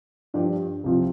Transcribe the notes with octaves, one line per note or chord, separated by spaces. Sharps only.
G2 F3 D4 G4 D5
C2 C3 F3 C4 F4